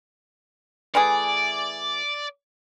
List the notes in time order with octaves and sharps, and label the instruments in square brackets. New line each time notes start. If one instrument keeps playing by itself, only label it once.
[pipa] E3 A3 G#4 [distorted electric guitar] D5